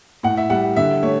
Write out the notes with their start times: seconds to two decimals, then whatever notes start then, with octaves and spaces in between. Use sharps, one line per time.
0.23 A2 F#5
0.37 E5
0.50 G3 F#5
0.76 D3 E5
1.03 A3 C#5